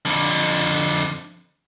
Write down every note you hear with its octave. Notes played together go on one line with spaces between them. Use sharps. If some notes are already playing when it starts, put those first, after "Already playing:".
F2 D3